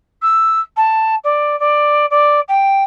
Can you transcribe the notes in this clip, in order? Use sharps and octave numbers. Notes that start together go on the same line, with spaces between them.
E6
A5
D5
D5
D5
G5